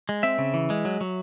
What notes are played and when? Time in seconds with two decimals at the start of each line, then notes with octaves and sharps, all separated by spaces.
0.09 G#3
0.23 C4 E5
0.38 C#3
0.54 E3
0.70 G#3
0.85 F#3
1.01 F#3